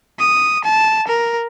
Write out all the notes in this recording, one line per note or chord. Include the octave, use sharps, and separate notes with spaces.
D#6
A5
A#4